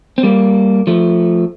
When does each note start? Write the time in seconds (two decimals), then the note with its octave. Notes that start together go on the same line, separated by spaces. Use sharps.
0.18 C4
0.23 G3 A#3
0.87 F3 A3